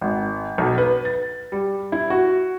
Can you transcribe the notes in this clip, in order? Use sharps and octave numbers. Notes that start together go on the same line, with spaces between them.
G#1
B1
B4
A6
G3
E4
F#4